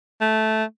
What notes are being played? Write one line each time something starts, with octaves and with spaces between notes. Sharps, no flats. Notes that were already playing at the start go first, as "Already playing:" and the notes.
A3